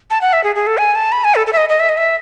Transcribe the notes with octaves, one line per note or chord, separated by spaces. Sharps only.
A5
F#5
E5
G#4
G#4
A4
G#5
A5
B5
G#5
A4
A4
E5
D#5
D#5
E5
D#5
E5